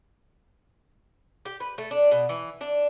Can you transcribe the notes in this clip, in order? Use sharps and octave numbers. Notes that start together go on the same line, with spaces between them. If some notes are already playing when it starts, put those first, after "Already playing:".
G4
B4
A3
D4
B2
E3
D4